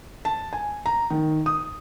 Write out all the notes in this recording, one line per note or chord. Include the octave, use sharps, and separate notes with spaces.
A5
G#5
A#5
D#3
D#6